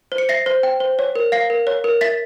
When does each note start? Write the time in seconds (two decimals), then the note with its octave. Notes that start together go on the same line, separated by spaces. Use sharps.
0.12 C5
0.18 C#7
0.29 E5 A#6 C7
0.46 C5
0.63 G5
0.80 C5
0.99 C#5
1.15 A#4
1.32 F5 A#6 C7
1.50 A#4
1.67 C#5
1.84 A#4
2.01 E5 A6 B6